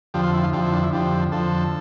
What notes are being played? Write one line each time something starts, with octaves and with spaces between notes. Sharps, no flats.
F2 D3 F3 G4
F4
E4
F4
F2 D3 F3 G4
E4
D4
E4
F2 D3 F3 G4
F2 D3 F3 A4